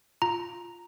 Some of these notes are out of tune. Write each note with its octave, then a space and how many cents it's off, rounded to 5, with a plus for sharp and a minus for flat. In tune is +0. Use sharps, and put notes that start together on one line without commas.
F4 +0 A#5 +0